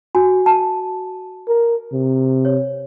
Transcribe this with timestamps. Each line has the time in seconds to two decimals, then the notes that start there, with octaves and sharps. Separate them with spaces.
0.15 F#4 G#5
0.46 A5
1.48 A#4
1.93 C3
2.45 C#5